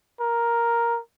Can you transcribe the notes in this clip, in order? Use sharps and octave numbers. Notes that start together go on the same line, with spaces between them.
A#4